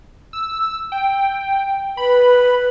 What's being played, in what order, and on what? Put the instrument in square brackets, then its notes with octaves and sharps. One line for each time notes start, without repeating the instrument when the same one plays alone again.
[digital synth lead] E6
G5
[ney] B4 [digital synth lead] B5